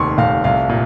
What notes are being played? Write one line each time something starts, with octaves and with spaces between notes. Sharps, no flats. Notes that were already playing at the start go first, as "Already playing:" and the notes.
Already playing: F1 D#2 C6 C#6
F1 F5
C2 F5
A#2